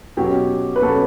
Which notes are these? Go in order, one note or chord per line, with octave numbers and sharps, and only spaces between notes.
B2 F#3 C#4 G4
B4
B2 F#3 C#4 A4